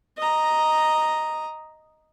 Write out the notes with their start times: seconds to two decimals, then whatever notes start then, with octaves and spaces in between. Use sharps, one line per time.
0.18 D#5 A#5